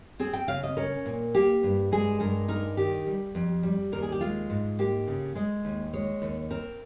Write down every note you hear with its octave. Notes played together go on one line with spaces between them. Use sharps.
C4 G#4
G5
C#3 F5
D#5
C#4 A#4
A#2
A#3 G4
G2
G#3 G#4
G2 A#4
D#4 A#4
D#3 G4
G3
F2
G3
D#2 A#4
G#4
G4
G#3 F4
G#2
A#3 G4
C#3
G#3 D#5
D#2
G#3 C#5
D#2
C4 A#4